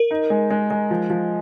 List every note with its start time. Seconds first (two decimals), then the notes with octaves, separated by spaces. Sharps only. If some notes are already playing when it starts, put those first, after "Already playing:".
Already playing: A#4
0.11 D#4
0.30 G#3
0.50 G#3
0.71 G#3
0.91 F3
1.10 F3